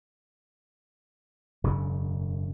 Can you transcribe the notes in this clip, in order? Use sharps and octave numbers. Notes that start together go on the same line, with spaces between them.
E1 F#2 C#3 D4